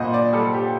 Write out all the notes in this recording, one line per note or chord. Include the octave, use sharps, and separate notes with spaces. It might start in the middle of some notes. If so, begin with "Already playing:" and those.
Already playing: A#2 G3 C5 D#5 F#5
D5
G3 A4
G4